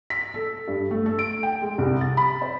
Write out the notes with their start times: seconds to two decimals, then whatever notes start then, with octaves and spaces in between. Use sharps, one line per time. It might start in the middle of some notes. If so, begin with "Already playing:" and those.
0.10 B6
0.34 A4
0.68 G2
0.91 A3
1.06 A4
1.19 D7
1.43 G5
1.61 G#3
1.78 C2
2.01 A6
2.17 B5
2.42 C5